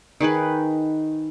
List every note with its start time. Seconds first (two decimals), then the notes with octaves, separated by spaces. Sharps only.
0.21 D#3 D#4 G#4 B4